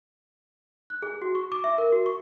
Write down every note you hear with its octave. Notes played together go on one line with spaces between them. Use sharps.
F#6
G#4
F#4
C#6
D6
E5
A#4
F#4
C#6